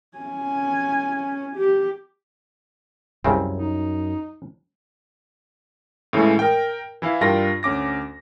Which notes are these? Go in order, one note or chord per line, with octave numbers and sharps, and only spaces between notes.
C#4 G#5
G4
C2 F#2 C#3 C4
D#4
A2 C#3 E3 G#3 A3
A#4 G5
E3 E4 F5
G2 D4 F4 A#4 G5 A#6
D2 C#4 D6 A#6